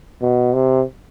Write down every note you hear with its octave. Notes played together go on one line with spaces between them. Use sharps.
B2
C3